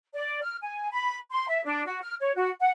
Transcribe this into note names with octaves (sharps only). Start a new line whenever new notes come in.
D5
F6
G#5
B5
C6
E5
D4
F#4
F6
C#5
F#4
F#5